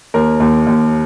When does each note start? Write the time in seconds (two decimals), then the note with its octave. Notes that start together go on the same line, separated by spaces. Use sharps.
0.14 D#2 A#4
0.40 D#2
0.67 D#2